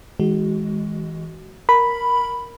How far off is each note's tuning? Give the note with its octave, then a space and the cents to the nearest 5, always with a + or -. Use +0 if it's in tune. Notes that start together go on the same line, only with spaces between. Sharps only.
E3 -30 G#3 +0 F#4 +25
A#4 +5 B5 +0